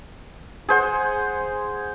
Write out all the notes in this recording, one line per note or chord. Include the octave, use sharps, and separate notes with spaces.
G#4 C5 F#5